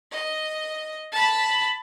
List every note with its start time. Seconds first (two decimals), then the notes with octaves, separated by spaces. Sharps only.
0.11 D#5
1.11 A5 B5